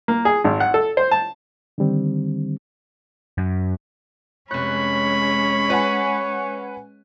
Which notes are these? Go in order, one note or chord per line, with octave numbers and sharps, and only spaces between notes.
A#3
G#4
G#1
F#5
A4
C5
A5
D3 D#3 G3 C4
F#2
F1 G#3 C#4 C#5 B5 F#6
B4 F#5 G#5